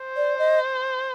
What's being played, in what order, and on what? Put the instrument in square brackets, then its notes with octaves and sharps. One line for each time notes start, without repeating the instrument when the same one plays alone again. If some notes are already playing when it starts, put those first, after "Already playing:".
Already playing: [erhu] C5
[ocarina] D5
D#5